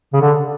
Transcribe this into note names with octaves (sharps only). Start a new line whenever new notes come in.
C#3
D3